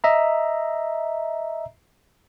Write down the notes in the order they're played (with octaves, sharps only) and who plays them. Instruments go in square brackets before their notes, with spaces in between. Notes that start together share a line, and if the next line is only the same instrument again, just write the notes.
[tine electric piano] D#5 E5 A#5